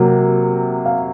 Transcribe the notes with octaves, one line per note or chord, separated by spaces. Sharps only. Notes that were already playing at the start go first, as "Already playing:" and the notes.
Already playing: C3 F#3 A#3
F5